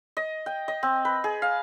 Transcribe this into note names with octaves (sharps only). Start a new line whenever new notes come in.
D#5
G5
D#5
C4
B4
G#4
F5